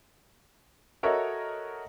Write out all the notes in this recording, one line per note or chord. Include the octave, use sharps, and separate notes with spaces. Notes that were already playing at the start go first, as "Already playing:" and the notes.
F#4 A4 A#4 C#5 D#5 E5